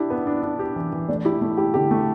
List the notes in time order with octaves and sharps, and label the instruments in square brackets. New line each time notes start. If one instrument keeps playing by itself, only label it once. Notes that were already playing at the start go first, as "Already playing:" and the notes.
Already playing: [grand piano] D4 G4 [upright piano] E4
[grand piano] B3
D4
D4
G4
E3
E3
[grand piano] A3 [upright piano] D4
[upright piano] E4 [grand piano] G4
[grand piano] A3
[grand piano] E4 [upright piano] G4
[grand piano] D3 [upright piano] G4
[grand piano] A3